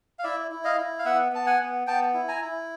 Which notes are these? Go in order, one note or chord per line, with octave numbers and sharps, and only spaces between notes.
F5
E4 D5 E5
E4
D#5 F5
E4
F5
B3 E5 F#5
B3 A5
F#5 G#5
B3
B3 G5 A5
E4
G#5 A#5
E4